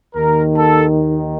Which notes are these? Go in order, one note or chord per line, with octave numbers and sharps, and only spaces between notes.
D#2 D#3 A#4
A4